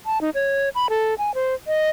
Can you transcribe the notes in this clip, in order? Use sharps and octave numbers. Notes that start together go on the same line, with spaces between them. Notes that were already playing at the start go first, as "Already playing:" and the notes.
A5
D#4
C#5
B5
A4
G#5
C5
D#5